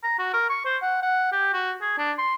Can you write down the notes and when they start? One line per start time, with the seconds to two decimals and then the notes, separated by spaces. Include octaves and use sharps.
0.03 A#5
0.18 F#4
0.33 A#4
0.49 C#6
0.65 C5
0.82 F#5
1.02 F#5
1.32 G4
1.53 F#4
1.81 G#4
1.98 D4
2.18 C6